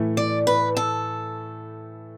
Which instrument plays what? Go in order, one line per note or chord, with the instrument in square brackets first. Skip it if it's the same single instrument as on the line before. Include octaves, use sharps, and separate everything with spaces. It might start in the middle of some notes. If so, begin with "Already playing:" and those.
Already playing: [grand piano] A2 E3 A3 E4
[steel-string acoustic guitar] D5
B4
A4